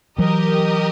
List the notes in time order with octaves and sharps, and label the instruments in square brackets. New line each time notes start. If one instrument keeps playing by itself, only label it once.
[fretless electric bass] E3 F#3 [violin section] G4 A#4 D#5